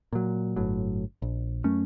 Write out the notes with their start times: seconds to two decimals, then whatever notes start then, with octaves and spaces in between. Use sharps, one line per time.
0.13 A#2 F#3
0.56 G1 A2 F#3
1.22 A#1
1.64 F#2 A3 C#4